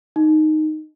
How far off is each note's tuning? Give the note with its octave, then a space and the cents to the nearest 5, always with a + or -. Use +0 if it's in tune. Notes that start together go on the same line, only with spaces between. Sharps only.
D#4 -5